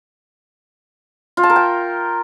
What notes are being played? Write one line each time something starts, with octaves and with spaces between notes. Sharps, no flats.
F4
A5
A#4
G5